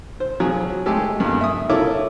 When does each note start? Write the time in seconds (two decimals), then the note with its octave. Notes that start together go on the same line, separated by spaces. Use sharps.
0.20 C5
0.40 F3 F#3 G#4
0.86 G#3 A3 G4 A4
1.20 G2 A#2
1.41 E5 D#6
1.70 E4 F4 A4 A#4 C#5 D6